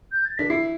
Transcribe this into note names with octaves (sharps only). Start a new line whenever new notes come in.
G6
A6
D4 B6
E4 C7